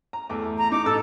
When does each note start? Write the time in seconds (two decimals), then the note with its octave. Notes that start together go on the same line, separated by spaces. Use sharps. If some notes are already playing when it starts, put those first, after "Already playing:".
0.13 A#5
0.29 E2 A3 D6
0.58 A#5
0.72 D#4 D6
0.86 A1 A4 E6